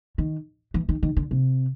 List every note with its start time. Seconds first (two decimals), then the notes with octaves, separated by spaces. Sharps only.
0.18 D#3
0.74 E3
0.89 D#3
1.03 D#3
1.17 D3
1.31 C3